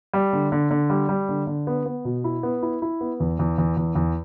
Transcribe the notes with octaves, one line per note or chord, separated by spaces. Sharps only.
G3
D3
D3
D3
G3
G3
D3
D3
B3
B3
B2
E4
B3
E4
E4
B3
E2
E2
E2
E2
E2